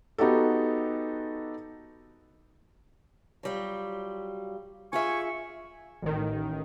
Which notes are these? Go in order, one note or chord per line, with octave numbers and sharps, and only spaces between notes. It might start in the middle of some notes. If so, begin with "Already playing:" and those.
B3 D#4 F#4 G4 A4
F#3 G3 F4
F4 G#4 E5 G#5 C#6
A1 D#3